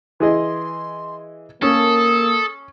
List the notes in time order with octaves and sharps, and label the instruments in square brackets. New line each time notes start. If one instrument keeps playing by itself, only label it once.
[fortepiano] E3 G#4 D#5 [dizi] C6
[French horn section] A#3 [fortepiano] C#4 [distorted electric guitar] A4 [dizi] D#6